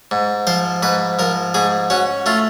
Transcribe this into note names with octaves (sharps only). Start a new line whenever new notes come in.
G#2
F3 C5
G#2 B4
F3 A#4
G#2 G#4
C#4 F#4
A3 F4